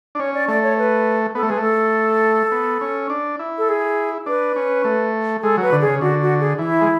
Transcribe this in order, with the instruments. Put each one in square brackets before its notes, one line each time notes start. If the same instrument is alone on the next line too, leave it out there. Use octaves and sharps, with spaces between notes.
[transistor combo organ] D4
[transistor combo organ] C#4 [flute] C#5
[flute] D5
[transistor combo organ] A3 [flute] D5
[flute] C#5
B4
[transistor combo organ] B3 [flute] A4
[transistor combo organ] A3
[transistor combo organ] G#3 [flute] B4
[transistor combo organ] A3 [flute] A4
[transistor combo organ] B3
C#4
D4
E4
[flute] A4
G#4
[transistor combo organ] D4 [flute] B4
[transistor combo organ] C#4
A3
[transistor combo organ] G#3 [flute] A4
[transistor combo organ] F#3 [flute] B4
[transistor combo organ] D3
[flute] G#4
[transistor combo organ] C#3
[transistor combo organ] D3 [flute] F#4
[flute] F#4
G#4
[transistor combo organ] E3 [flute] E4
[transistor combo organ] G#3